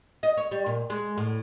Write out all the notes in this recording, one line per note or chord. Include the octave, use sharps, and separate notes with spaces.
D#5
C#5
G3
A#2
G#3
A2